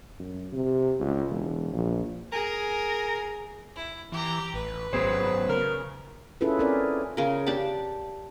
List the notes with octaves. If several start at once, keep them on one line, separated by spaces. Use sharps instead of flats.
F#2
C3
C#2
E1
A#1
G#4 A#4
E4
E3 G4 A#5
A1 B4
G#1 F#3 B3 G#4 C5
C#3 A#4
C#4 E4 F4 G#4 A4 B4
C4 C#4 G#4 A#4 D5
C#3 A#4
D4 G4 D5 A5